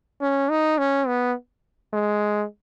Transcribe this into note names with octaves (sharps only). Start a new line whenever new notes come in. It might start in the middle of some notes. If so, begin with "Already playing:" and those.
C#4
D#4
C#4
B3
G#3